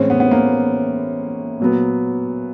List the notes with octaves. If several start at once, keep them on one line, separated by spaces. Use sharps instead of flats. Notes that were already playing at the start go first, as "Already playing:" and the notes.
Already playing: A2 E3 G#3 C4 C#4
B3
B3
A#3
A#2 F#3 B3